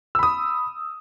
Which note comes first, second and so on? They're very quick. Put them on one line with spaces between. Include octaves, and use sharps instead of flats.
E6 B5 D#6